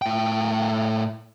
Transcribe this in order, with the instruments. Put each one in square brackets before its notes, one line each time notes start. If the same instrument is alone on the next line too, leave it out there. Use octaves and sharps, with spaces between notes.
[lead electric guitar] A2 G5